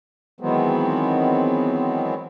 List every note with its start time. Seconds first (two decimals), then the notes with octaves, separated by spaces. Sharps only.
0.40 D#3 E3 F#3 G#3 B3 C4